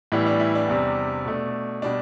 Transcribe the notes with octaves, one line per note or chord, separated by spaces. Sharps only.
A2 E3 G3 B3 E4
D4
E4
D4
E2 C3 G3
B2 A3 D4
B2 G3 D4